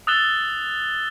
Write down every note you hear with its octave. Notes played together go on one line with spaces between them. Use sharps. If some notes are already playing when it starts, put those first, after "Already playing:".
D#6 E6 F#6 A6 E7 G7